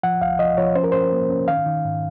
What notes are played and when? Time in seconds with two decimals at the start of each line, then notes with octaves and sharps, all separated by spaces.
0.03 F3 F#5
0.22 C2 F5
0.39 F3 D#5
0.58 F3 C#5
0.75 C#4 C5
0.84 A#4
0.92 C#4 C5
1.12 A#3
1.30 C#4
1.48 D#3 F5
1.66 D#3
1.84 G#2